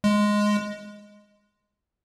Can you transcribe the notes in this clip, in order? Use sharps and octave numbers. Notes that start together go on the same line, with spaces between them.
G#3